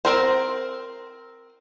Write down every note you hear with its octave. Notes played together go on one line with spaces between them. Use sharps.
C4 A#4 C5